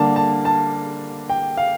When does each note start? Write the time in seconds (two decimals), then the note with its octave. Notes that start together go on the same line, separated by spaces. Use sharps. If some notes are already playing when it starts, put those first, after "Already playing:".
Already playing: D3 G3 A#3 D4 A5
0.16 A5
0.45 A5
1.30 G5
1.57 F5